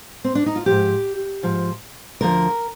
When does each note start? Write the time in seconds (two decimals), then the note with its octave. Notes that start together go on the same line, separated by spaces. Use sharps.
0.24 C4
0.35 D4
0.46 D#4
0.56 F4
0.66 G#2 F3 G4
1.43 G#2 F3
2.21 D2 D3 F3 A#4